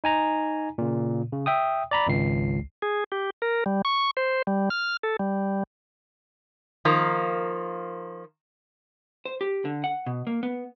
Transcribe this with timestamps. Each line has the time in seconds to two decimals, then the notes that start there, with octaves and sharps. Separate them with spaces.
0.04 D#4 G#5 A#5
0.78 A#2 C#3
1.32 C#3
1.46 E5 G5 D#6
1.91 D5 A#5 B5
2.07 G#1 C#2 C7
2.82 G#4
3.12 G4
3.42 A#4
3.66 G3
3.85 C#6
4.17 C5
4.47 G3
4.70 F6
5.03 A4
5.19 G3
6.85 D#3 F3 A#3
9.25 C5
9.41 G4
9.65 D3
9.84 F#5
10.06 B2
10.27 A#3
10.43 B3